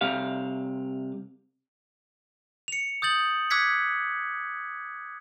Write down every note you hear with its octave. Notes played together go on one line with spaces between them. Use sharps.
C2 C3 F5
C#7 F7
D#6 G6 A6 F#7
D6 E6 F#6 G#6 B6 C#7